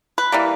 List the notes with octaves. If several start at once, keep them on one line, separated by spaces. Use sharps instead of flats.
B4
E3 G3 A#3